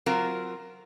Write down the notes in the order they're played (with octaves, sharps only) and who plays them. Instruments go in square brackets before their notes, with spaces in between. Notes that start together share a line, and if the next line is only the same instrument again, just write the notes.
[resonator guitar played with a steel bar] F#3 C4 F4 A#4